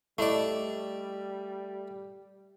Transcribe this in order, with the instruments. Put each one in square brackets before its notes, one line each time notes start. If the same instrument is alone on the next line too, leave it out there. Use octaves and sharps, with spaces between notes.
[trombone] G3 [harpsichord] A3 D5 [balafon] E4 D#5 A5